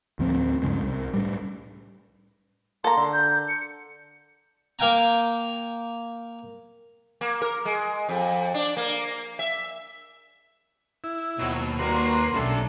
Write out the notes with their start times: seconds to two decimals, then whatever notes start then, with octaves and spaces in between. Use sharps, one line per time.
0.19 D2 A2 F3 C4
0.62 C#2 G2 C#3 G#3
0.83 C2
1.13 A2 G3
2.84 A#3 A4 A#5 C6
2.97 D3
3.13 G6
3.48 C#7
4.79 A#3 A#4 F5 G5 G#5 A#5
7.21 A#3
7.42 A#4
7.65 G#3
8.09 F2
8.54 D4
8.77 A#3
9.39 E5
11.04 E4
11.39 D#2 B2 D#3 F3 F#3
11.79 G3 A#3 F#4 B4 A#5 C6
12.35 B1 G3 C#4 D4 A4 E5